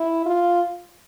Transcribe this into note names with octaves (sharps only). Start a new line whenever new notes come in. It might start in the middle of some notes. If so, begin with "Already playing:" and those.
Already playing: E4
F4